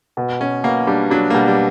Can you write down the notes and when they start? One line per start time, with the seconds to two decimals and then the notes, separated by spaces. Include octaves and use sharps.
0.17 B2
0.41 B2 C#4
0.64 B2 A#3
0.87 G3 D4
1.11 F#3 D4
1.30 A#3
1.34 B2 G3
1.48 G3